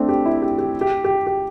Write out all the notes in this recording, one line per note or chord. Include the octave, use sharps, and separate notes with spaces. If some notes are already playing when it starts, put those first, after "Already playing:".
Already playing: A3 C4 D4
G4
E4
G4
G4
G4
G4
G4